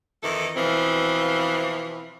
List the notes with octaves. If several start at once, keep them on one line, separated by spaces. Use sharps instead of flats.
F2 D#3 E3 A4
B2 E3 F3 C4